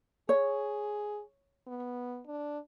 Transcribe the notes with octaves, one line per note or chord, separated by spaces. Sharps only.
G#4 C#5
B3
D4